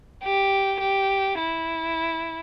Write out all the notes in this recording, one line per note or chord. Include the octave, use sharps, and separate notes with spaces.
G4
G4
E4